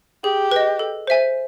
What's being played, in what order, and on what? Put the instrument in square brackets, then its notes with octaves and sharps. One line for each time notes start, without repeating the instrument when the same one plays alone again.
[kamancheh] G4 [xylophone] G#4
[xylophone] B4 D#5
A4
C5 E5 G#5